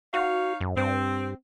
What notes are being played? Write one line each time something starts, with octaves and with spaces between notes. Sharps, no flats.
D#4 F#4 C#5 F5
F#2
G2 C4